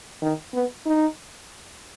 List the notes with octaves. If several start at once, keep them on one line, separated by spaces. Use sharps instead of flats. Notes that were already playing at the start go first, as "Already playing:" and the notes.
D#3
B3
D#4